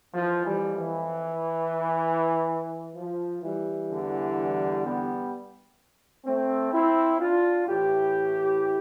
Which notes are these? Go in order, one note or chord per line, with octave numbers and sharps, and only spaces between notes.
F2 E3 F3
E3 G3
E3
F3
E3 G3
E2 D3
G3 B3
A3 C4
C4 E4
D4 F4
A2 E3 E4 G4